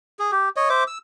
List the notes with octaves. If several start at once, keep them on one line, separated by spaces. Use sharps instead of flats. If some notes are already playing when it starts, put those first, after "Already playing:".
G#4
G4
C#5 D#5
C5 E5 D6
E6